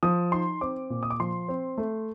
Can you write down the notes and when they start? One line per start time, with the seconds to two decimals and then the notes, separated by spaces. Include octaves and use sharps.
0.03 F3 D#6
0.32 D#4 C6
0.61 C4 D6
0.90 A#2
1.03 D#6
1.10 D6
1.20 F3 C6
1.48 C4
1.78 A3